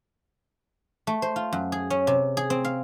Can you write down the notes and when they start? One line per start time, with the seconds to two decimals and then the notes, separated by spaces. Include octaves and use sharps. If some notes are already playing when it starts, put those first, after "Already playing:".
1.07 A3
1.22 C5
1.36 F4
1.53 F#2
1.72 G#4
1.90 C#4
2.07 C3
2.37 G#4
2.50 C4
2.65 F5